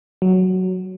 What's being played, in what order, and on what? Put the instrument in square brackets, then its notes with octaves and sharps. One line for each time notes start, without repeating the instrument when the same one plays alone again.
[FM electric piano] F#3